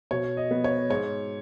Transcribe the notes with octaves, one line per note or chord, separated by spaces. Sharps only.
B2 C#5
D#5
B3
C#5
G#2 C#5